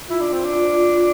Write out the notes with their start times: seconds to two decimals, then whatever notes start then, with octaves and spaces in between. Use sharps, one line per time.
0.08 E4 F4
0.20 D4
0.33 C4
0.44 D4